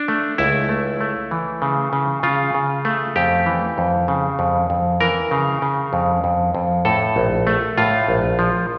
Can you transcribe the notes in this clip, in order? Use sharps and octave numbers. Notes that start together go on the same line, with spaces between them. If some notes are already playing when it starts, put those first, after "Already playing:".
Already playing: D4
A3
C#2 E4
A3
A3
E3
C#3
C#3
C#3 F4
C#3
A3
F2 G4
E3
F2
C#3
F2
F2
E3 A#4
C#3
C#3
F2
F2
F2
A2 A4
A#1
A3
A2 F4
A#1
F3